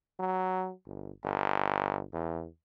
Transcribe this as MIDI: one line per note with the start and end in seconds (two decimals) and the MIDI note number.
0.20 0.72 54
0.86 1.11 31
1.24 2.03 31
2.13 2.47 40